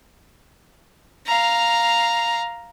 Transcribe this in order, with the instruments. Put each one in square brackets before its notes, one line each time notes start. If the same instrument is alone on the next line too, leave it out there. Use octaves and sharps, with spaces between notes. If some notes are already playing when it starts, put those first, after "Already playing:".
[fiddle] F5 A#5